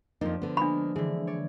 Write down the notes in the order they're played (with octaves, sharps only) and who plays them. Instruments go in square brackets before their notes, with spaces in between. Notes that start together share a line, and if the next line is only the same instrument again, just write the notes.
[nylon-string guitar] F2 A#3 D#4 [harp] F3 D4
[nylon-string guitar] D3 B3
[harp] G#3 A#3 [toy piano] D4 B5
[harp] D3 E3 [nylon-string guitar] G#4
[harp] C#5 D5